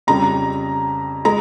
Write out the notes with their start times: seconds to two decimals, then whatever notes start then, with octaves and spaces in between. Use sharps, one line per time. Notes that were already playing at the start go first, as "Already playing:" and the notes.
0.07 F2 C#3 G3 A#5
1.25 G#3 A#5